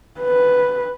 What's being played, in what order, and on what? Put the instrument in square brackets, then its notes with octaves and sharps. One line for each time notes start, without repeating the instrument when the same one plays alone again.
[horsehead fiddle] B4